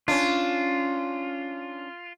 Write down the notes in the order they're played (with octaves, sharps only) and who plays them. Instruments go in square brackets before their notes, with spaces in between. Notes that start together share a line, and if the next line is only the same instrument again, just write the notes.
[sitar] C#4 D4 [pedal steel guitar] F4